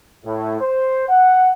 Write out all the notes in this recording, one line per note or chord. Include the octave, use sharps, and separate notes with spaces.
A2
C5
F#5